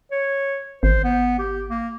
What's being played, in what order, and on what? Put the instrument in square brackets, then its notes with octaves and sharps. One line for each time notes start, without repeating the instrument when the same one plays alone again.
[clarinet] C#5
[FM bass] G#1 [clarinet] C5
[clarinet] B3
G4
A#3